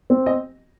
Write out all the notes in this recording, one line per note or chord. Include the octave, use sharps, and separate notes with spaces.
C4
D#5